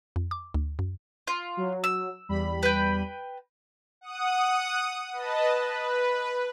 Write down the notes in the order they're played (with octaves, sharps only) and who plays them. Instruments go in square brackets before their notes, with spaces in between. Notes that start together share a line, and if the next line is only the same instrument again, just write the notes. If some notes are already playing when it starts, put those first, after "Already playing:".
[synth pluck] F2
D6
D2
F#2
[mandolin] F4
[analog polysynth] F#3
[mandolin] E6
[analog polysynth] E2 G3 B5
[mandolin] B4 G5
[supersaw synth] F#5 D#6
B4 D#5 A5
B4